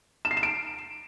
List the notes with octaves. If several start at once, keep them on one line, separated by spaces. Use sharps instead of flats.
E7
C7
E7
D7